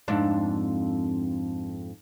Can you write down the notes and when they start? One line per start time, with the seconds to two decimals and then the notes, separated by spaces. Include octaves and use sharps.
0.08 F2 G#2 D4